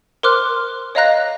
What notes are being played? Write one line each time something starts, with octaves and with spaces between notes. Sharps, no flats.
A#4 C5 C6 D6 F6 F#6
C#5 D#5 F5 A#5 F#6 A#6